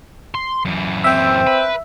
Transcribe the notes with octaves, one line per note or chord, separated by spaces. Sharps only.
C6
F#2 E3
C4 E5
B4